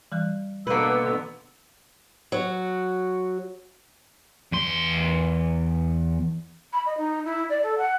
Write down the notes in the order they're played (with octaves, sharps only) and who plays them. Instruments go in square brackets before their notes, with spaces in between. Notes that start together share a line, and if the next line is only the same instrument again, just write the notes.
[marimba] E3 G3 F#6
[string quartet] B2 D3 B3 [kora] A#3 B4 [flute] E6
[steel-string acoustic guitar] F#3 F#4
[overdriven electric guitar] E2 C6
[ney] B5
D#5
D#4
E4
D5
A4
F#5